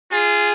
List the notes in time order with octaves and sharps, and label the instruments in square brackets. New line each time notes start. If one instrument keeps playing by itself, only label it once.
[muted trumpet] F4 [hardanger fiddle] G#4